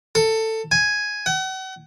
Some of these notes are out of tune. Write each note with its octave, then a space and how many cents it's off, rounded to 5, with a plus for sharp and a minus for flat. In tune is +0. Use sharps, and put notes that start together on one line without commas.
A4 +15
G#5 +0
F#5 +40